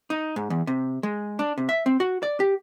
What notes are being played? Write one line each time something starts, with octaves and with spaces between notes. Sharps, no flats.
D#4
G#2
E2
C3
G#3
D4
C3
E5
C4
F#4
D5
G4